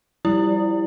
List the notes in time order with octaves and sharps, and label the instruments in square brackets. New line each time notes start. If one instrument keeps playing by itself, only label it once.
[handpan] F3 G3 [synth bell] E4